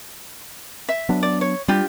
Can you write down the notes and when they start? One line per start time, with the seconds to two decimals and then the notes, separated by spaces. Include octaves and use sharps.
0.89 E5
1.09 F#3 B3 D4
1.23 D5
1.41 C#5
1.68 G3 D4 F4 G4